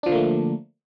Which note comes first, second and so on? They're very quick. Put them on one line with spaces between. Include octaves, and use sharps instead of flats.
D4 F3 D3 A#3 A3